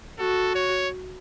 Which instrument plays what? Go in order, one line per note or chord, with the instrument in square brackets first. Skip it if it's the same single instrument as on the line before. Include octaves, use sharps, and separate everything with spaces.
[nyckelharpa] F#4 [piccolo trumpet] A4
[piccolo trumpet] C#5